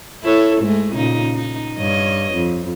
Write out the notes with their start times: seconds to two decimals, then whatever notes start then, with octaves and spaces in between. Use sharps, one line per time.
0.23 E4 A4 C#5
0.61 G#2 G#3 A3
0.94 A#2 C#3 D#4
1.35 D#4
1.78 G2 C#5 D#5
2.34 F2